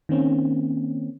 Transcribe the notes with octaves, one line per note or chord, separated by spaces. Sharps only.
D#3 A#3 C4 C#4